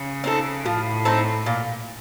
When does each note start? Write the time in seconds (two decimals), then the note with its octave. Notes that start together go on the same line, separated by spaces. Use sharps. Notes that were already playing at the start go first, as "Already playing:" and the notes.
Already playing: C#3
0.24 C4 D#4 A4
0.65 A2 F3
1.05 C4 D#4 A4
1.46 A#2